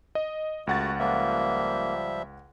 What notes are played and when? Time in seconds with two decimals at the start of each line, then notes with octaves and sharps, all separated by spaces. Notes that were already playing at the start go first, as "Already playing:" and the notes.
0.15 D#5
0.67 C#2 A3 F#4 F#5 A6
0.99 F3 G3 A#3 E5